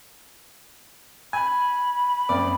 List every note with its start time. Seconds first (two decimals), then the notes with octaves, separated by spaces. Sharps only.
1.33 G#5 B5
2.29 F#1 F2 D5